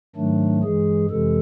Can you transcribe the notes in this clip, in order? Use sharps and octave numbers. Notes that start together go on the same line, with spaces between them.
G#2 D#3 F#3 A3 D4
G2 E3 G#3 G#4
F2 C3 E3 G#3 A4